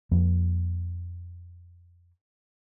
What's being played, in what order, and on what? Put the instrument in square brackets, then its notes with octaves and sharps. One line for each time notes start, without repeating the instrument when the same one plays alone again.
[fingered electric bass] F2 F3 A#3